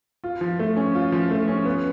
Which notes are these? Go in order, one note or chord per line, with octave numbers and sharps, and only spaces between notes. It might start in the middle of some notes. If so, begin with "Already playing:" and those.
F4
F3
A3
C#4
F4
F3
A3
C#4
B3